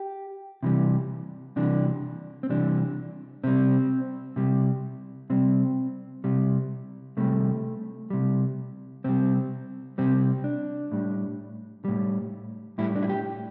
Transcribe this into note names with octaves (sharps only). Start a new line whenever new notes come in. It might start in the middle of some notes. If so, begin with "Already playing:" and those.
Already playing: G4
C3 E3 G3
C3 E3 G3 D4
C4
C3 E3 G3 D4
C3 G3 C4
C3 G3
C3 G3 C4
C3 G3
C3 G3 A3
C3 G3
C3 G3 C4
C3 G3 C4
D4
A2 G3
A2 G3
A2 G3 E4
D4
E4
G4